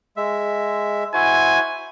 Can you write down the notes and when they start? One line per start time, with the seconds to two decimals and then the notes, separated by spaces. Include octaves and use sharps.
0.17 G#3 E5
1.14 E4 F#4 C5 G#5